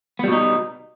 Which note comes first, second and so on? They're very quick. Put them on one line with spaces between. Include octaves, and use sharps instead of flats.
B3 G3 B2 D#4